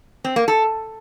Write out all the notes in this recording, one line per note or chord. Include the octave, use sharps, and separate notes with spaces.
C4
A#3
A4